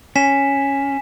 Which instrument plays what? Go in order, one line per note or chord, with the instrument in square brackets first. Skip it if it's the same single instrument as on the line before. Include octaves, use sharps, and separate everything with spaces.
[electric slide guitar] C#4 [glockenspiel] G#5 B6 E7